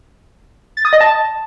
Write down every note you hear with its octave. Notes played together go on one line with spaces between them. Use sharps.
A6
D#6
D#5
A5